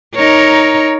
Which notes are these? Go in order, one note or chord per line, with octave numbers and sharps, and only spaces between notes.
D#4 A#4 C#5